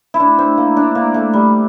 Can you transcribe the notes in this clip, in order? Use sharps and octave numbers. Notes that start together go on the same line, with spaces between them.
E4
D4
C4
A#3
D4
A#3
A3
G3